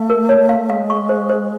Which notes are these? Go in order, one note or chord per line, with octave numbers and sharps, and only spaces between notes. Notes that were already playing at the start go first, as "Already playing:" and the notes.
Already playing: A3 F5
A#4
C#5
F5
G#3 F5
C#6
C5
C5